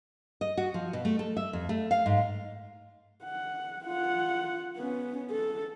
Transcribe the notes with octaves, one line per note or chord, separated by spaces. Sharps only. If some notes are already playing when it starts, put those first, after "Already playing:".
D#5
F#4
F3
B2
A3
A4
E5
F2
A3
F5
G#2
F#5
F4 F#5
B3 C#4
A4